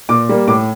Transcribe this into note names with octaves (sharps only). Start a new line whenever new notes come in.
A#2 D6
G3 A#3
A2 D6